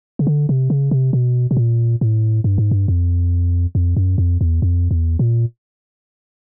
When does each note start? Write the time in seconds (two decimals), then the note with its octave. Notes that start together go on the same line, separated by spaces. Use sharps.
0.19 C#3
0.27 D3
0.49 C3
0.70 C#3
0.91 C3
1.13 B2
1.51 B2
1.57 A#2
2.01 A2
2.44 G2
2.58 G#2
2.71 G2
2.88 F2
3.75 F2
3.97 F#2
4.18 F2
4.41 E2
4.62 F2
4.91 E2
5.19 A#2